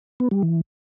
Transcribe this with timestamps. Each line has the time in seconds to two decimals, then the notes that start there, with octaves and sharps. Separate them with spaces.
0.20 B3
0.31 G3
0.43 E3